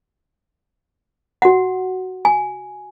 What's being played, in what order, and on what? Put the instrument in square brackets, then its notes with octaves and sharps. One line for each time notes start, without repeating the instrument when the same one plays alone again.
[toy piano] F#4 F#5
G#5